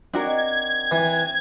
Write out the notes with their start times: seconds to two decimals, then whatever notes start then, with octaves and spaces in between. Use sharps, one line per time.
0.13 C4 D4 D#4 F#4 A#4 G#6
0.91 E3